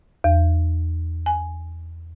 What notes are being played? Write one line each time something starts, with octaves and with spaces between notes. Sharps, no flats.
E2
G#5